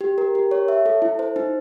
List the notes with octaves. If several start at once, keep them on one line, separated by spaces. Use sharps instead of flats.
G4
A#4
G4
C#5
E5
A4
E4
C5
D#4